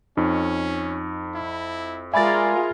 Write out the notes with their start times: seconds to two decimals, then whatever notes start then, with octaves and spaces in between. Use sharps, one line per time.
0.17 F2 C#4 D#4
1.35 E4
2.14 G#3 F4 A#4 D5 E5 G#5 B5 A6